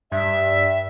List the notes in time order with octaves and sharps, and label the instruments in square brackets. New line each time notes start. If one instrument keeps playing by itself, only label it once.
[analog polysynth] G2 [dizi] E5